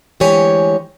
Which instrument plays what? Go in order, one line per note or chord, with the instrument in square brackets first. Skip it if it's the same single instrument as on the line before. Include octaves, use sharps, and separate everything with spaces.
[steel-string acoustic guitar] D2 E3 G#3 G4 C#5 G#5